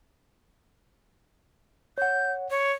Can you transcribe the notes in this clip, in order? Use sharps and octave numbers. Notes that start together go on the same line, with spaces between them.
C#5 F#5 G6
C#5